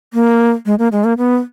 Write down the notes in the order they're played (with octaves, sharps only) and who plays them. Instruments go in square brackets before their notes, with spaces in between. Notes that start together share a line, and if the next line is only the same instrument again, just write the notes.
[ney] A#3
G#3
A#3
G#3
A#3
B3